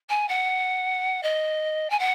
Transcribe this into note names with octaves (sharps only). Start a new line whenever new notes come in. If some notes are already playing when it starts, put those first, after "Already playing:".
G#5
F#5
D#5
G#5
F#5